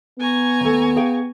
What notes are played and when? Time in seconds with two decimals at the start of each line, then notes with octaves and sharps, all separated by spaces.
0.19 B3 G#5 A#5 C#6
0.61 D#2 A3
0.96 G#4 F5 G5